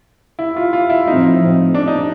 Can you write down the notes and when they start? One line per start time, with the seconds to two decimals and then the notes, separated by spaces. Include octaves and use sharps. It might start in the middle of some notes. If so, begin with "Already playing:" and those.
0.39 E4
0.56 F4
0.73 F4
0.90 E4
1.07 A2 F3 A3 C4 D#4
1.75 D4
1.88 D#4